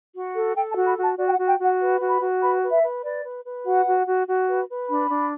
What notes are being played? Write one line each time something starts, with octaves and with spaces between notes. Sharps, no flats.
F#4
A4
A4 G5
A5
F#4
B5
F#4
A5
F#4 D5
G5
F#5
F#4
G5
F#4 F#5
B4
F#4
B5
F#4
B4 B5
B4
E5
B4
B4 D5
B4
B4
F#4 F#5
F#4
F#4
F#4
B4
B4
D4 B5
D4